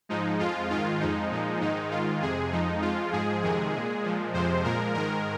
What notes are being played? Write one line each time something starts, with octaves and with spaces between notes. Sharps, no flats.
G#2 F3 G#3 D#4
F2 F3 G#3 F4
G#2 D#3 G#3 F4
F2 F3 G#3 D#4
A#2 F3 G#3
G#2 D#3 G#3 D#4
G#2 D#3 G#3 F4
F2 C3 G#3 G#4
F2 F3 G#3 D#4
F2 F3 G#3 F4
G#2 F3 G#3 G#4
F2 C3 D#3 G#3 G#4
A#2 G#3
A#2 F3 G#3
F2 C3 F3 G#3 C5
A#2 F3 G#3 A#4
G#2 D#3 G#3 A#4